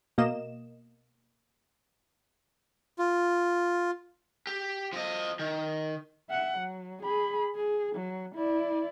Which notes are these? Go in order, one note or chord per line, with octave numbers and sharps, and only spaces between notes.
B2 A#3 D#5 E7
F4
G4
F3 D#5
D#3
E5 F#5
F#3
G#4 B5
G#4
F#3
E4 D5